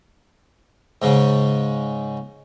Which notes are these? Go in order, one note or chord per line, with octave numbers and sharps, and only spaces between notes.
G#2 C#3